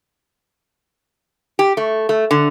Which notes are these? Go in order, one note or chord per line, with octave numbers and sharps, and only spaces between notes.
G4
A3
A3
D3